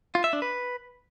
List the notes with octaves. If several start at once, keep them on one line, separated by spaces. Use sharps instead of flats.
F4
E5
D4
B4